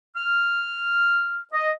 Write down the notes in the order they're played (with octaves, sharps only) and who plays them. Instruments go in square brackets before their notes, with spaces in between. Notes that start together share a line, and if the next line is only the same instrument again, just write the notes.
[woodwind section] F6
D#5